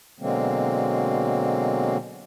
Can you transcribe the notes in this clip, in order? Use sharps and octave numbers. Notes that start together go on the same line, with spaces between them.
B2 D3 F#3 G#3 A#3 C4